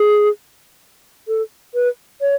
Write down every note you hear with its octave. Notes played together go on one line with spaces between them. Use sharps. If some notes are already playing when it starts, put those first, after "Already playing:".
Already playing: G#4
A4
B4
C#5